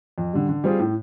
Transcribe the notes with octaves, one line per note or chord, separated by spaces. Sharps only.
F2
D3 G3
D3
G3 C4 F4 G#4
A2